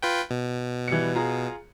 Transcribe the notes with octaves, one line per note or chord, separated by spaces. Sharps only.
F4 B4 G5
B2
E3 G3 C#7
F4 G#4 A#5